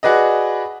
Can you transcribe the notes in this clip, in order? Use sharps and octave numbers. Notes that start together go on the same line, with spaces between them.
F#4 G#4 B4 D5 D#5